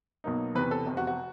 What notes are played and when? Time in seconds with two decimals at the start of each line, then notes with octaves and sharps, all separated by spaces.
0.24 B1 B2 F#3 A#3 D#4
0.55 E2 C3 E3 B4
0.71 A4
0.86 F1 E2 C3
0.97 F#4
1.07 F#4